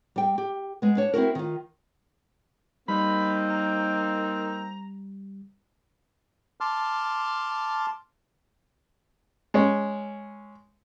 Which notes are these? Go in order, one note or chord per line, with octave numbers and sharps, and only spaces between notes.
G3 G5
G4
G#3 B3
D4 C#5
C4 E4 F#4 A#4
D#3 F4
G3 A#3 C4 D#4 B5
A#5
A5 C6 D6 F6
G#3 C#4